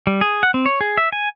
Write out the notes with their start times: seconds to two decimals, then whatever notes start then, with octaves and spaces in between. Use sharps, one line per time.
0.07 G3
0.21 G#4
0.43 F#5
0.54 C4
0.66 C#5
0.81 G#4
0.98 E5
1.12 G#5